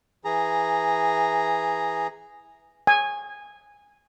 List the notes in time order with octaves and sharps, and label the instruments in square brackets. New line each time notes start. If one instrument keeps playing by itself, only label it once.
[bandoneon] E3 G#4 A#5
[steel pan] G#5